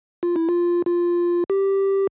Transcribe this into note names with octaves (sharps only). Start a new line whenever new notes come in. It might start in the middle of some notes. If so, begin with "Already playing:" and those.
F4
E4
F4
F4
G4